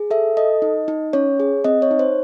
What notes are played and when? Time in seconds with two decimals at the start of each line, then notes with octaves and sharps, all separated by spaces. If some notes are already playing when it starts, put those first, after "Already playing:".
Already playing: G#4
0.11 A4 E5
0.37 A4 D#5
0.62 D#4
0.88 D#4
1.13 C#4 C#5
1.40 G#4
1.64 C4 D#5
1.82 C#5
1.91 D#4
1.99 C5